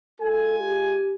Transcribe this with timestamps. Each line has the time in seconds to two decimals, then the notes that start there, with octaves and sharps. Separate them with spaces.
0.20 G#3 F4 A4 G#5
0.59 G4